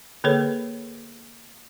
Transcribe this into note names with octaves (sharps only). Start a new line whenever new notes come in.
D3 A#3 G#4 A4 B4 C#5